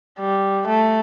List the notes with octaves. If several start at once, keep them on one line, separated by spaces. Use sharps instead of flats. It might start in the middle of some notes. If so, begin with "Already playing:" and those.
G3
A3